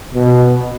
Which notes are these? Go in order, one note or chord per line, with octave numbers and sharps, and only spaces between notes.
B2